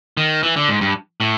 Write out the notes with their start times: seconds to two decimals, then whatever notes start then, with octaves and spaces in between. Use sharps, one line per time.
0.17 D#3
0.43 E3
0.56 D3
0.69 G#2
0.81 G2
1.21 A2